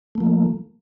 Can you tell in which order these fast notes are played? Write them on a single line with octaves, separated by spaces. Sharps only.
A3 A#3 F3